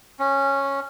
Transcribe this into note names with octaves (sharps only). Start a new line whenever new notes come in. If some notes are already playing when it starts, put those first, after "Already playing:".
C#4